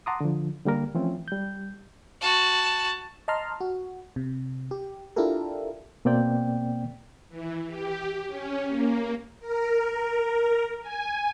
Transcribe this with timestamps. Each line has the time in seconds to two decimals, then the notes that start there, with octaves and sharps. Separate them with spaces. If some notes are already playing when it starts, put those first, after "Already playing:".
0.06 F#5 A5 A#5 C6 D6 D#6
0.21 D3 F3
0.65 D3 G3 A#3 A#4
0.95 E3 F3 A3 C4 C#4 E4
1.28 G3 G6
2.21 F#4 A5
3.28 D#5 A5 A#5 C6 F6
3.61 F#4
4.16 C3
4.71 G4
5.16 D4 E4 F4 G4 A4 A#4
6.05 B2 A#3 C4 D5 G5
7.29 E3
7.67 G4
8.28 C#4
8.67 A#3
9.40 A#4
10.82 G#5